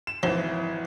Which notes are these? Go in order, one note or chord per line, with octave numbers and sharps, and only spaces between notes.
E7
G#1 E3 F3